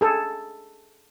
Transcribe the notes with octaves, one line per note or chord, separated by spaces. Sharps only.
G#4 A4